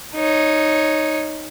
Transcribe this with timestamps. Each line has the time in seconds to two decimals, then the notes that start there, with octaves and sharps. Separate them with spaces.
0.15 D#4 C#5